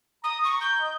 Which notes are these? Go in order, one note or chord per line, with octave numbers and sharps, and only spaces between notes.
A#5 D#6
C#6
G6
D#5